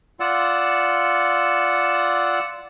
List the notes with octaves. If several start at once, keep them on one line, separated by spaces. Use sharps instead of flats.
F4 D5 F#5 E6